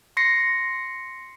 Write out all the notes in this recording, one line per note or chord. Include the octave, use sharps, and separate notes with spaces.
C6 A#6 C7 C#7